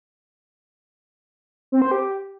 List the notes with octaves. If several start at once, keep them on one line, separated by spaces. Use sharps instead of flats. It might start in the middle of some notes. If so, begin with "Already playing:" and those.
C4
C5
G4